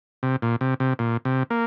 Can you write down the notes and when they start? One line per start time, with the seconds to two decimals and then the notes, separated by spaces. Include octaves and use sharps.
0.23 C3
0.42 A#2
0.61 C3
0.80 C3
0.99 A#2
1.25 C3
1.50 A#3